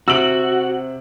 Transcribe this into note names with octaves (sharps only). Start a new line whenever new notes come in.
C3 F#4 E6 D7 F#7